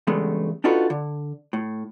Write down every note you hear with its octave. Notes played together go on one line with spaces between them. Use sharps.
E2 G2 C#3 G#3 A3 B3
D4 D#4 F4 F#4 A4 B4
D3
A2